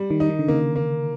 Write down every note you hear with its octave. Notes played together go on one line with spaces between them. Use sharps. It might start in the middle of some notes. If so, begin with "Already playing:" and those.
Already playing: G3
D#3
D#4
D#3
D3
C#3 A#3
A#3